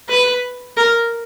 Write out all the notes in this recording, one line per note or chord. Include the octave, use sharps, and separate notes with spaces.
B4
A#4